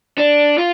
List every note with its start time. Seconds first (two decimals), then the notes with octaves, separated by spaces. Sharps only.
0.18 D4
0.58 F4